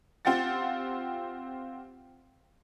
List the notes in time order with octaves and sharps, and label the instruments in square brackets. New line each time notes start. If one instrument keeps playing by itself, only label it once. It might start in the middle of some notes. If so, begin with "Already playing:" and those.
[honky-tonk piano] C4 F4 G4 F#5 A6